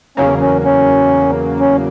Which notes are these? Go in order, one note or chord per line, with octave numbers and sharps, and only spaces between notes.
E2 C#3 F#3 A#3 C#4
C#4
C#4
C#4